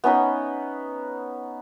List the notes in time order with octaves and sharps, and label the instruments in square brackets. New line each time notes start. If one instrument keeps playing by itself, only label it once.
[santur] B3 C#4 D#4 B4